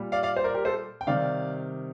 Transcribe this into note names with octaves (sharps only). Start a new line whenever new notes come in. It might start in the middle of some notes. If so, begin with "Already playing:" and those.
Already playing: A#2 G3
D5 F5
D5 F5
C5
A#4 D5
G4 A#4
A4 C5
G5
C3 D#3 G3 D5 F5